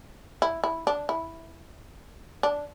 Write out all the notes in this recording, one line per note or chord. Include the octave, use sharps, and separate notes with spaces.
E4
E4
D4
E4
D4